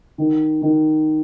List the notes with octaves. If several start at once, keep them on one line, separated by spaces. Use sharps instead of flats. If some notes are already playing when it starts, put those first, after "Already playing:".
D#3
D#3